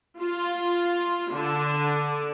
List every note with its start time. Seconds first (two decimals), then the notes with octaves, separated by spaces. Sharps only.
0.20 F4
1.33 D3